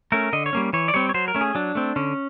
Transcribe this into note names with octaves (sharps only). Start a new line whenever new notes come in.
A3 C#4 A#4
D3 D#5
C#5
G3 A#3 C#4
E3 C#5
D5
G3 C4 C#5
C#5
F#3 C5
A#4
A3 C#4
G#4
F#3 D4
A3 C4
D3 C#4